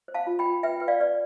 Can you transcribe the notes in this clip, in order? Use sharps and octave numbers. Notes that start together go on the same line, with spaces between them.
C5
F5 A5
F4
G5 B5
F4
B4 E5 G5
B4 G5
D5 F5
B4 D5